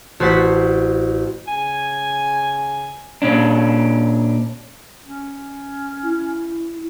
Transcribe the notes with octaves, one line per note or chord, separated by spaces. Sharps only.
A1 F#4 C5 A6 B6
C#3 G#5
A#2 C#4 D4
C#4
E4